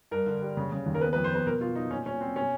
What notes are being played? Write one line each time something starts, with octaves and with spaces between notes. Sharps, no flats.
G2 A#4
D3
G3
C#3
C#3
D#2
A#4
B3 B4
B4
F2
C5
B3 B4
B2 A#4
B2 F4
F#3 D#4
A#2 C#4
A#2 C#4
F#3 C4
B2 C#4